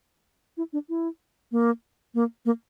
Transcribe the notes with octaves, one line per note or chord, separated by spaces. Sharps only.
E4
D4
E4
A#3
A#3
A#3